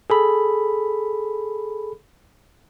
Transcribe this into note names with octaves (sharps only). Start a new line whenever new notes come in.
G#4 A4 B5